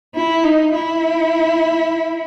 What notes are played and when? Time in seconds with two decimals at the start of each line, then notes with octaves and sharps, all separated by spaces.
0.14 E4
0.44 D#4
0.74 E4